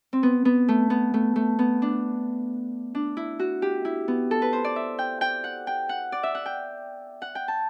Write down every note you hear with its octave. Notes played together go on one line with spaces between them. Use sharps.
C4
B3
B3
A3
B3
A3
A3
B3
D4
D4
E4
F#4
G4
E4
B3
A4
B4
C5
D5
E5
G5
G5
F#5
G5
F#5
D5
E5
F#5
G5
F#5
G5
A5